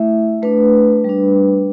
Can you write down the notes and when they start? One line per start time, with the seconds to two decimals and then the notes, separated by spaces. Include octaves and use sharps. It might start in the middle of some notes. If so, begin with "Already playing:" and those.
Already playing: A3 E4 E5
0.42 A3 D4 B4
1.04 G3 D4